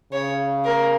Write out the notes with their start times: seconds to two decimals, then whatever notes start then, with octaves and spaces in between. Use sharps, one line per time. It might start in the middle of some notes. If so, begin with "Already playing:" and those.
0.12 C#3 C#5
0.65 A#4